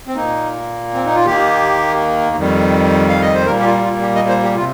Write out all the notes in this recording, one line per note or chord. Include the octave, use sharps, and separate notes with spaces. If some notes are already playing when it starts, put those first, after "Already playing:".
C4
A#2 A#3 D#4
C4
D#4
F4
D#2 D#3 A#3 G4
F2 D#3 G3
F5
D#5
C5
A#2 G3 A#3 A#4
G4
F4
F4
G4
D#5
C5
G4
C3 F4